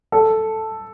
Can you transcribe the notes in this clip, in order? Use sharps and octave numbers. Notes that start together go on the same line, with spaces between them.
A4